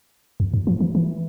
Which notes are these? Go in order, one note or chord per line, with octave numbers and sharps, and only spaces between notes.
F2
G2
F3
E3
E3